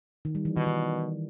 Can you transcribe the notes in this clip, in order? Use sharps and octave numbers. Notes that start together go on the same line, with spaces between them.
D#3
G3
E3
B2 D#3
D#3